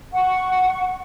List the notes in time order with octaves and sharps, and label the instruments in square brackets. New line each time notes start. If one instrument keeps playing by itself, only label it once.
[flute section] F#5 C#6